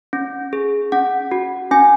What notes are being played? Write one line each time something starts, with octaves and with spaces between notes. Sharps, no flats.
C#4
G#4
C#4 F#5
F#4
C#4 G#5